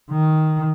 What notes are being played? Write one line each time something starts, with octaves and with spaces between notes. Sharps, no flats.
D#3